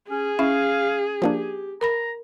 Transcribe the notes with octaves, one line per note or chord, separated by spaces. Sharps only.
C#4 G#4
C#4 E4 F5
F3 A#3 D4 G4
A#4 A#5 B5 A#6